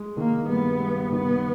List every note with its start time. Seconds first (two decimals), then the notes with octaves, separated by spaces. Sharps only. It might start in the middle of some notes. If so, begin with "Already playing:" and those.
Already playing: G#3
0.17 D#3 A#3
0.48 G2 B3
0.80 G2
1.12 D#3 B3